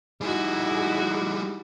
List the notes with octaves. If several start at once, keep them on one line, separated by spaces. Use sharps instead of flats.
G3 D#4 E4 F#4 G#4